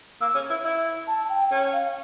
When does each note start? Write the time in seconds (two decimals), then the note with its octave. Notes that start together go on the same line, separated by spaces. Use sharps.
0.21 A#3 E6
0.35 C#4
0.50 E4
0.65 E4
1.07 A5
1.29 G5
1.51 C#4 G5
1.73 F5